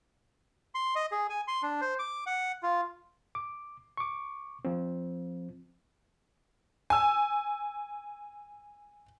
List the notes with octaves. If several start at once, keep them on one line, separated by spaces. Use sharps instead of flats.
C6
D#5
G#4
G#5
C6
D4
C5
D6
F#5
F4
D6
C#6 D6
F3 C4
G#5 E6